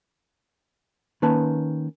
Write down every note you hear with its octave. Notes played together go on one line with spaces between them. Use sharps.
D#3 A#3 C#4 B4 A5